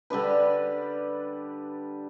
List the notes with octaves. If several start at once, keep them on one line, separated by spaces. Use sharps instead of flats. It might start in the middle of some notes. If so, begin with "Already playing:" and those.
D3 G3 D4 B4